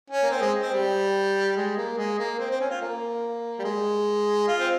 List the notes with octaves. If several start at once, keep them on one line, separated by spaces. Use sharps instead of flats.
C#4
A#3
C4
G#3
C4
G3
G#3
A#3
G#3
A#3
C4
C4
C#4
F4
A#3
G3
G#3
F4
C4